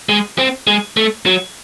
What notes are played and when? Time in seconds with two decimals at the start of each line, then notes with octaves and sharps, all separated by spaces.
0.09 G#3
0.38 C4
0.67 G#3
0.97 A3
1.26 F#3